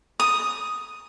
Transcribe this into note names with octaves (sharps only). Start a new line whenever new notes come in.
D#6